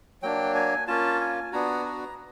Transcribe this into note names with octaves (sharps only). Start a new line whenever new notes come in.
F#3 A#3 D4 G5
G#5
A#3 C#4 F4 A5
G#5
B3 D4 F#4 A#5
A#5